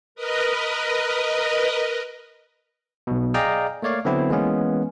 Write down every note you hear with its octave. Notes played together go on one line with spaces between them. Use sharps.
A#4 B4 D#5
B1 B2
G#4 D5 D#5 F5 G5 A#5
A3 A#3 C#5 D5 F5
D3 F#3 B3 C4 E4
E3 G#3 A#3 B3 C#4